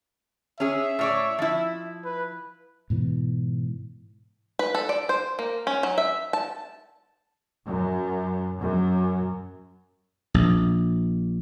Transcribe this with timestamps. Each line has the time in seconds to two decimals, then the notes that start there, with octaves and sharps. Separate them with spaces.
0.60 C#4 G#4 E5
0.99 A2 C#5 D5
1.38 F3 E4
2.04 B4
2.90 G#2 B2 E3
4.59 B4
4.75 A4
4.89 D5
5.09 C5
5.39 A#3
5.67 C#4
5.83 F#3
5.98 E5
6.33 A5
7.66 F#2
8.60 F#2
10.34 A#1